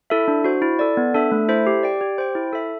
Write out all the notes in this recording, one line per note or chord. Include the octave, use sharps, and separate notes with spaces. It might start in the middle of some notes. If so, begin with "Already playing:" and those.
E4 A4 E5
D4
F#4 C5
E4
A4 D5
B3
D4 A4 E5
A3
E4 A4 C5 E5
G4
D5 G5
G4
C5 G5
E4
A4 E5